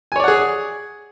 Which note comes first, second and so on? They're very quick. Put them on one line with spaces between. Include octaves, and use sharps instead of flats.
G#5 C#5 D5 F#5 G#4